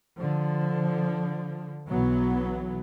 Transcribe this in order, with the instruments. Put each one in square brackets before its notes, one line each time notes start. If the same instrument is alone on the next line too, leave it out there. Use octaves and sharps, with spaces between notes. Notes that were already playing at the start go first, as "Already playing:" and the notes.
[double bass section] D3 F3
B1 E3 F#3 B3